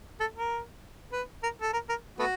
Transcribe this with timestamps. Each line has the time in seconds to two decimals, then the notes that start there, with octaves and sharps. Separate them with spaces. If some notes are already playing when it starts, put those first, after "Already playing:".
0.20 A4
0.36 A#4
1.12 B4
1.43 A#4
1.62 A4
1.73 A#4
1.89 A#4
2.19 A3 B3 F#4